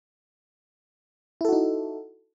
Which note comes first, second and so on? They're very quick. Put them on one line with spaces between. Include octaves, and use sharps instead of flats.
E4 A4 F#4 D#4